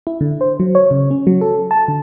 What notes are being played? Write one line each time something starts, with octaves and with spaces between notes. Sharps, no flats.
E4
D3
C5
F#3
C#5
C#3
C#4
F#3
A4
A5
D3